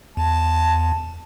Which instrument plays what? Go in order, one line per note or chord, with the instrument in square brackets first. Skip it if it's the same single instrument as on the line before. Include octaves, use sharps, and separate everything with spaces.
[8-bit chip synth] E2 [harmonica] A5